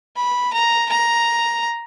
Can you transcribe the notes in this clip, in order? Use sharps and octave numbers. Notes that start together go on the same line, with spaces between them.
B5
A#5
A#5